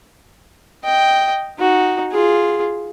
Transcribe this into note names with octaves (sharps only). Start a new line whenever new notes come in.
D#5 G5
D#4 F#4
F4 G#4